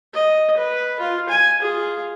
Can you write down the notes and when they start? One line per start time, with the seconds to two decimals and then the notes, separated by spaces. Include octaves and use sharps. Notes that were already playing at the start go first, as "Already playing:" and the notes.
0.14 D#5
0.57 B4
1.00 F4
1.29 G#5
1.62 F4 G#4